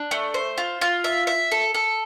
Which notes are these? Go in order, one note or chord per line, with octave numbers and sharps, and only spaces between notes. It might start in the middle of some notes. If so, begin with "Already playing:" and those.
Already playing: D4
A3
C5
F4
F4
E5
E5
A4
A4